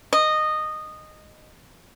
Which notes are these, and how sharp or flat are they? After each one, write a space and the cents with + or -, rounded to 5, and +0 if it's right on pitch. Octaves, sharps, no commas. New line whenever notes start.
D#5 -15